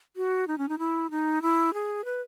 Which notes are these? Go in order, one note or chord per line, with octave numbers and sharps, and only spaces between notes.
F#4
D#4
C#4
D#4
E4
D#4
E4
G#4
B4